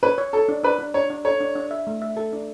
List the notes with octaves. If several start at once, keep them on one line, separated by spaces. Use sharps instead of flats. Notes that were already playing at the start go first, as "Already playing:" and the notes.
B4 C#5
C#5
A4 C#5
D4
D4 B4
D4
D4 C#5
D4
A4 C#5
D4
D4
E5
A3
E5
A4
D4